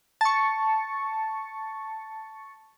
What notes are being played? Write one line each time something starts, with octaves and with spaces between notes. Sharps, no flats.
A5 C#6